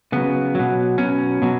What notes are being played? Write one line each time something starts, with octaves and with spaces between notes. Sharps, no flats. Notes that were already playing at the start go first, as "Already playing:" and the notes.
C#3 F#3 B3
B2 F#3
B2 F#3 C#4
B2 F#3